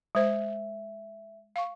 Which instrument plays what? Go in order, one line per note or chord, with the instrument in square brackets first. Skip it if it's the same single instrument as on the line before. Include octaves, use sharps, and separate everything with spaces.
[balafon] G#3 C5 [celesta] E5
[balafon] F5 C#6